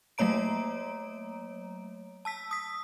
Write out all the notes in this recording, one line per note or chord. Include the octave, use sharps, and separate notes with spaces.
F#3 A3 A#3 C#5 A#5 D7
A5 E6 B6
D#6 B6